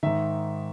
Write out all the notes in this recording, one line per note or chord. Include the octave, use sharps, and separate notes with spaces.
G#2 D#3 E5